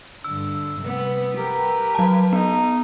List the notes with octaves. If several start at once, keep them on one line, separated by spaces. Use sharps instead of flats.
G2 D3 E6
C3 G3 B3
G4 A#4 B4
F#3 A5
B3 D#4